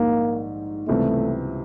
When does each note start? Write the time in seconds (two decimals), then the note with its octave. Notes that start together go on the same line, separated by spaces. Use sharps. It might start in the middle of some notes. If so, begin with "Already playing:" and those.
Already playing: A#1 G#2 D#3 G3 A#3
0.88 C#2 C3 E3 G3 A3 C4